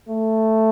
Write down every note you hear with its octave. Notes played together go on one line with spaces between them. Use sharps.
A3